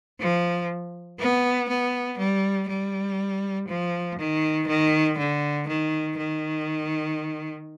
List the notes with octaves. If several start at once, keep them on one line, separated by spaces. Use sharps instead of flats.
F3
B3
B3
G3
G3
F3
D#3
D#3
D3
D#3
D#3